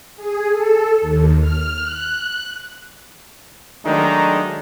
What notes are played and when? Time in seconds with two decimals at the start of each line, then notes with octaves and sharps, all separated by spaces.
0.17 G#4
0.51 A4
1.02 D#2
1.41 F6
1.81 F#6
3.85 D#3 F#3 G#3 A3 D4 D#4